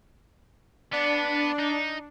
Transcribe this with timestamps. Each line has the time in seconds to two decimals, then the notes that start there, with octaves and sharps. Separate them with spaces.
0.93 B3 D4
1.59 D#4